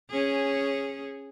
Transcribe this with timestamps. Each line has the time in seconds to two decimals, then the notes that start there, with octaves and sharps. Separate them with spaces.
0.10 C#4 G#4